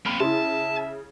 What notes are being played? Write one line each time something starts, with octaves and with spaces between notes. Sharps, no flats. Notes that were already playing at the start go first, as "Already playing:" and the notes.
A#3 C4 B5 F6
C#3 E4 E5 A5 C6